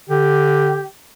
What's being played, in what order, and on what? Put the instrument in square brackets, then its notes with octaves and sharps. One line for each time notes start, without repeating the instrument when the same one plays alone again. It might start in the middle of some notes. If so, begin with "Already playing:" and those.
[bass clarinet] D3 [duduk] G4